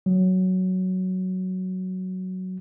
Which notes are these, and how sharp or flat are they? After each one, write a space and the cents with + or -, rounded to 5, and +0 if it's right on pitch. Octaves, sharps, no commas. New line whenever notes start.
F#3 +5